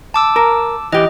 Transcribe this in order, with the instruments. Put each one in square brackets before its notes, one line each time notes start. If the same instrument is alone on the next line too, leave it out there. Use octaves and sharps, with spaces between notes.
[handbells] A5 D6 E6
[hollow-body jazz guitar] A#4
[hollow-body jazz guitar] E3 G4 [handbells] D#5